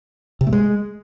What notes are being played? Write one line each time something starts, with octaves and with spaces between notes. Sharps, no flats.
C3
A3
G#3